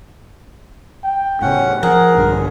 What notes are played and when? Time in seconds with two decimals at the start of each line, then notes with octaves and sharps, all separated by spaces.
1.04 G5
1.42 A2 C#3 C#4 F#5
1.83 F3 G#4 A#4 F#5
2.17 A#1 G2 D3